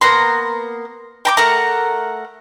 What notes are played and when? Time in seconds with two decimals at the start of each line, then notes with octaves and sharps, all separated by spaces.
0.01 A#3 B3 A#5 C6
1.25 G5 A#5 D6
1.37 A3 A#4 F#5 A#5